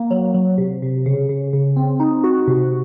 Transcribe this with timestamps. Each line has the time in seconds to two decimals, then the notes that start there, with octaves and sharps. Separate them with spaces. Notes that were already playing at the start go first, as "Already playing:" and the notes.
Already playing: A#3
0.11 F#3
0.34 F#3
0.58 C3
0.82 C3
1.06 C#3
1.29 C#3
1.53 C#3
1.76 C4
2.00 D#4
2.24 F#4
2.47 C3